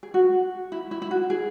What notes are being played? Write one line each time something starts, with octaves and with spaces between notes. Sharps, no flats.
G#4
F#4
E4
E4
E4
F#4
G#4